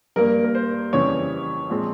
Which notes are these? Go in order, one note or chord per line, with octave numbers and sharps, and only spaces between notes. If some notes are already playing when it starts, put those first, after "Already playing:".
G2 G3 A#3 A#4
A#4
C5
F2 C#3 E3 G3 C#5
A#2 F3 G#3 C4